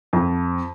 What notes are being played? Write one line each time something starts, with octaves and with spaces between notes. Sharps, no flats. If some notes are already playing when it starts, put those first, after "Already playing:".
F2